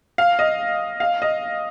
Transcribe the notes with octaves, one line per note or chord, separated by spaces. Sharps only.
F5
D#5
F5
D#5